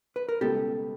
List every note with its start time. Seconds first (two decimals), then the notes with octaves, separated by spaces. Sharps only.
0.16 B4
0.29 A#4
0.41 C#2 B2 G3 B3 G4 A4